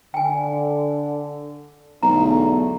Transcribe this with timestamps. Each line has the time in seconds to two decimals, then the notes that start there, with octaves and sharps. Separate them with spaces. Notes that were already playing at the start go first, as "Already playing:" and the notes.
0.14 D3 G5 G#5
2.03 B1 E2 D3 A3 A#5